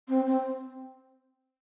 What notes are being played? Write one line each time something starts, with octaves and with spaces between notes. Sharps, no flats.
C4
C4